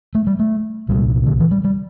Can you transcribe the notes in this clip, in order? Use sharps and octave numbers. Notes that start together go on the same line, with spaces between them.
A3
G3
A3
C2 A#2 G3
D3
E3
G3
G3